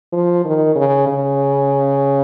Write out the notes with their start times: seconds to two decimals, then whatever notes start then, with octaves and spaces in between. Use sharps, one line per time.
0.13 F3
0.45 D#3
0.75 C#3
1.07 C#3